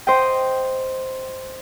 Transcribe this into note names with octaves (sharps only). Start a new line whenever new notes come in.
C5 D#5 G5